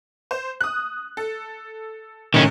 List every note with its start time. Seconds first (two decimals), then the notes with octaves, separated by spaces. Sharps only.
0.31 C5
0.61 D#6 F#6
1.17 A4
2.34 A2 C3 D#3 G#3 C#4